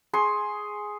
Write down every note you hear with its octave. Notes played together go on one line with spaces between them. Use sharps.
G#4 C6 C#6